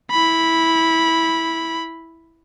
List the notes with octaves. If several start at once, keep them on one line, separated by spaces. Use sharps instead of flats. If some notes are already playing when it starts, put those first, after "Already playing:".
E4 B5